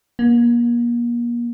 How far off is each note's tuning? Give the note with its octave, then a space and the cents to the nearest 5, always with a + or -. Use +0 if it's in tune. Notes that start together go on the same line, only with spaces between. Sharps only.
A#3 +35